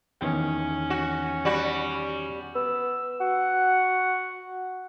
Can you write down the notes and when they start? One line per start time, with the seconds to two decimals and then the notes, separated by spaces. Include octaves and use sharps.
0.21 E2 D#3 C#4 G5
0.90 F#4
1.45 G3 F#4
2.55 B3 E6
3.20 F#4 F#5